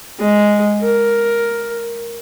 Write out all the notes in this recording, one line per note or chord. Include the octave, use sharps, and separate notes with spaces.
G#3
A#4